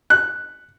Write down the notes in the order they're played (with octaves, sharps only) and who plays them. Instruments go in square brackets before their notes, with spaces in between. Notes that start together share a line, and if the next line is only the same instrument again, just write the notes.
[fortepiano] F#6